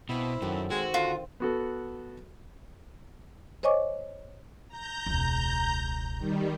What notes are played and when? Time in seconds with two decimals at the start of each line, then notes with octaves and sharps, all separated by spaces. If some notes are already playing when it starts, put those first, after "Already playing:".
0.09 B2 C4 E4 F5 B5
0.42 F#2 D#3 F#3 A4
0.71 G#3 C4 F#4
0.94 D3 F4
1.40 B3 F#4 A4
3.63 C5 C#5 D#5 G#5 C#6 D6
4.68 A#5 G6
5.06 E1 C#2
6.19 D#3 G3